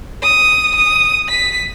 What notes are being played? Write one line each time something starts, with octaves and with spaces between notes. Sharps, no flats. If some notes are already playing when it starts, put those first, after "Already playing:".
D#6
D#6
B6